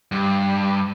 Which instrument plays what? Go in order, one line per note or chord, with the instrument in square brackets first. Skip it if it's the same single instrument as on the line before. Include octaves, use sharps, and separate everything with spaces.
[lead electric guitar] G2